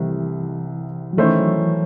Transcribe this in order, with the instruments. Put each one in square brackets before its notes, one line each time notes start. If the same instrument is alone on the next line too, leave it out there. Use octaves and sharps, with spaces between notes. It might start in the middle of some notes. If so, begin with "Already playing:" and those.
Already playing: [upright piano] C2 C3 D#3 A3 [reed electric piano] E3
[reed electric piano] F#3
[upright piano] D#3 A3 C#4 E4 C5 [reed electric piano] E3
[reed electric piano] F#3
E3
E3